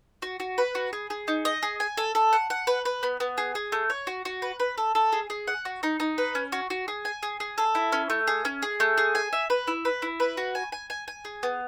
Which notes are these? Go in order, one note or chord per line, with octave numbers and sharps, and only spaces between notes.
F#4
F#4
B4
F#4
G#4
G#4
D#4
D#5
G#4
G#5
A4
A4
F#5
F#5
B4
B4
B3
B3
G#4
G#4
A3
C#5
F#4
F#4
B4
B4
A4
A4
G#4
G#4
F#5
F#4
D#4
D#4
B4
C#4
F#4
F#4
G#4
G#5
G#4
G#4
A4
E4
C#4
A3
G#4
C#4
G#4
A3
G#4
G#5
E5
B4
E4
B4
E4
B4
F#4
G#5
G#5
G#5
G#5
G#4
B3